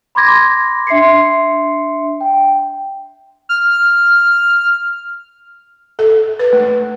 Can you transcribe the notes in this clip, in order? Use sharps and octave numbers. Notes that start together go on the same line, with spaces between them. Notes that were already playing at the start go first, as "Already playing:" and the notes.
B5 C6 D6 G#6 A#6
D4 E5 C6 C7 C#7
G5
F6
A4
B4
A3